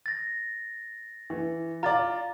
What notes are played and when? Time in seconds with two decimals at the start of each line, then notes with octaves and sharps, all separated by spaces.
0.06 A6 A#6
1.30 E3
1.83 F4 D5 A#5 A6